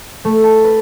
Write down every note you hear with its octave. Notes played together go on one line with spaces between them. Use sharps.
A3
A5
B4